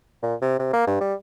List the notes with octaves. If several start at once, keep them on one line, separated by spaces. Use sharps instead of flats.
A#2
C3
C3
A#3
G2
G3